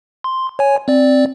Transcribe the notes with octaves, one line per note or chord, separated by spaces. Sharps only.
C6
C#5 G#5
C4 D5